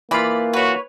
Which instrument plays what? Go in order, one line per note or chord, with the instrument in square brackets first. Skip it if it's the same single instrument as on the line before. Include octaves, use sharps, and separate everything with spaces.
[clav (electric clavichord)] E3 F4 [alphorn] A#3 [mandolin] D5 B5
[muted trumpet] F#4 [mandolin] B4 C#5